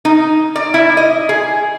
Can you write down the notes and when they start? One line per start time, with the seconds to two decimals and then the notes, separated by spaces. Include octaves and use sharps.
0.05 D#4
0.56 D5
0.74 E4
0.97 D#5
1.29 G#4